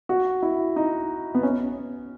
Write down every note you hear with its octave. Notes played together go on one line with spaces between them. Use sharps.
F#4
E4
D#4
B3
C#4